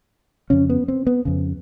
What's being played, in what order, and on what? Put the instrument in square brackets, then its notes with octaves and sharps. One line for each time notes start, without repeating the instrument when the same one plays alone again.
[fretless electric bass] F2 C#3 C#4
B3
C4
B3
F2 C#3